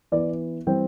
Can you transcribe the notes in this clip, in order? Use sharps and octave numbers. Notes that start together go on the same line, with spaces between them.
E3 B3 D5
E3 G3 C4 G5